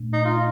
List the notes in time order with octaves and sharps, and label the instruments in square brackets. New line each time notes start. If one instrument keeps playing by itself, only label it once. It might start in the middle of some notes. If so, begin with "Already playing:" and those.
Already playing: [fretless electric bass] A#2 A3 D4
[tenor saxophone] D#4
F4